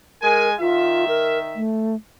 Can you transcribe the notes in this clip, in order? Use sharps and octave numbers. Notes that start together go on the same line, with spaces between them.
G#3 A#4 G#5
D#3 F4 E5
A#4
A3